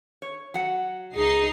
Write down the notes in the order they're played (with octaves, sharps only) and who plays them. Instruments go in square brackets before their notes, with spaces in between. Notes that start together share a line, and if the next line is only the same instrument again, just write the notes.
[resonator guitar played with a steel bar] C#5
F#3 F#5
[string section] C#2 D#4 C7 [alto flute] G#4